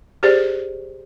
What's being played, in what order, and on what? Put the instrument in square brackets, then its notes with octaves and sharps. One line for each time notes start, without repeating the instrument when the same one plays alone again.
[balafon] G4 G#4 C5 D5